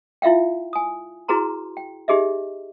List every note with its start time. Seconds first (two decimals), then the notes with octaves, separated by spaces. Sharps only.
0.22 E4 F4 E5 F5 G5
0.73 G#5 D#6
1.28 E4 F#4 G#4 B4 A#5 C6
1.77 G5
2.08 D#4 G4 G#4 D#5 E5